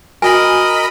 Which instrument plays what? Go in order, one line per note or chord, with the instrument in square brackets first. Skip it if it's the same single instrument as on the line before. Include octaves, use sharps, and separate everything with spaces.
[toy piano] F#4 G#5 [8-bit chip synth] A#4 D#5 B5